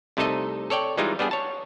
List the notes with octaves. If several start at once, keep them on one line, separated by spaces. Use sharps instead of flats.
C2 C3 A3 D#4 A4 D#5
A4 C#5 D5 G5
E3 G3 G#3 D#4 F4
G3 B3 D4 G#4
C#5 A5